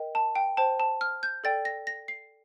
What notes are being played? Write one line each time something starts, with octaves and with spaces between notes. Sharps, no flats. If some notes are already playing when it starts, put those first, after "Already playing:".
Already playing: A#4 D#5 G5
A5
G5
C5 G5 A5
A5
F6
G6
A4 D5 G5 A6
A#6
A#6
C7